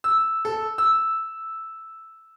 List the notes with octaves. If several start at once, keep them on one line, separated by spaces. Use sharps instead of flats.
E6
A4
E6